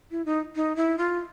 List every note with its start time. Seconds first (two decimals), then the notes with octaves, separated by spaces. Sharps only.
0.11 E4
0.25 D#4
0.56 D#4
0.76 E4
0.98 F4